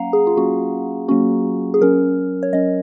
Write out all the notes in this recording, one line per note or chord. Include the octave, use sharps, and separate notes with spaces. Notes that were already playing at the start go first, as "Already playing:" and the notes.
Already playing: F#3 A#3 C#4 F5 F#5 A#5
G#4
F4
F#3 A#3 C#4 F#4
F#3 A#3 C#4 F#4
G#4
F#3 C#4 A#4
C#5
F#3 C#4 D#5